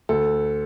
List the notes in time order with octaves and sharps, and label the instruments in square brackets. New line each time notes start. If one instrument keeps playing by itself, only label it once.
[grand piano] D2 A4